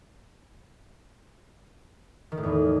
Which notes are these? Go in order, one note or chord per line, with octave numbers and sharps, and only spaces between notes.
D#3
A2
E2